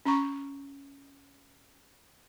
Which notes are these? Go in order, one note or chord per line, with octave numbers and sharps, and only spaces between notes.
C#4 A#5 C#6